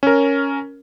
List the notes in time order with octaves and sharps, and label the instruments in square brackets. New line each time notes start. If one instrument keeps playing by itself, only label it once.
[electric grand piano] C#4 A#4